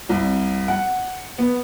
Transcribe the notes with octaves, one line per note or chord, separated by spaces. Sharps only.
C2
F#5
B3